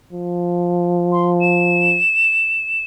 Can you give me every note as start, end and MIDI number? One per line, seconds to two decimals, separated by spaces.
0.12 2.00 53
1.12 1.30 84
1.41 2.85 100